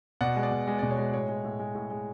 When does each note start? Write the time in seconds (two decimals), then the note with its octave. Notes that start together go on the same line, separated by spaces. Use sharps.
0.21 B2 D5 F#5
0.36 G#3
0.43 D5
0.51 B2
0.68 G#3
0.79 D5
0.83 B2
0.91 C#5
0.98 G#3
1.13 A2 C#5
1.29 G#3
1.44 A2
1.59 G#3
1.75 A2
1.90 G#3